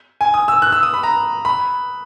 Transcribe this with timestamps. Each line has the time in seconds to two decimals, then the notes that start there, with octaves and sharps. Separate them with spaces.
0.21 G#5
0.34 D#6
0.48 E6
0.62 F#6
0.72 E6
0.83 D#6
0.94 B5
1.03 A#5
1.45 B5